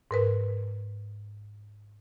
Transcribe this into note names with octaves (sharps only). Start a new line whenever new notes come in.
G#2 A#4 B4